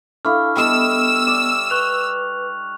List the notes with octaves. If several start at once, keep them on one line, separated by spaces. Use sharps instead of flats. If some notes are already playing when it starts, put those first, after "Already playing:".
D4 E4 A4 F5 C#6 F6
G3 B3 A4 D#5 E6
D5
B4 C#6 F#6 F7